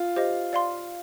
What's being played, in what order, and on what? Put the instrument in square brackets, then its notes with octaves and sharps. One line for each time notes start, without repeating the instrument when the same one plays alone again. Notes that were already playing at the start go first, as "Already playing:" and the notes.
Already playing: [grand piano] F4
[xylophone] G4 C5 D#5
D5 F5 C6